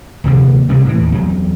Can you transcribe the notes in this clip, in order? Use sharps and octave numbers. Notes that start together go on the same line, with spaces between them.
D#1 C3 F3 A#3
C3 G3 G#3
A2 E3
D#2
E2 F#3 G3